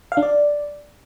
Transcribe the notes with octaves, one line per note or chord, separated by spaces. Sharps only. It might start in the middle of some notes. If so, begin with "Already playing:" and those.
F5
D4
D5